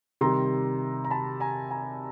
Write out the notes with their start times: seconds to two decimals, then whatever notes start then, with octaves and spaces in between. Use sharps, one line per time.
0.21 C3 D#3 G3 A#5 C6
1.05 A#5
1.10 A5 B5
1.40 G#5 A#5
1.71 G#5 A#5